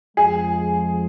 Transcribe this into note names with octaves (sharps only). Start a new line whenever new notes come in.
F2 F3 G#3 G#4